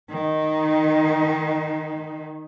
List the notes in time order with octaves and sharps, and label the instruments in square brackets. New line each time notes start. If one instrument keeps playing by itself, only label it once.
[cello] D#3 D#4